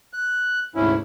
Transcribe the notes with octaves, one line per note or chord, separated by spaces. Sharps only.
F#6
D2 G#2 C3 C#4 E4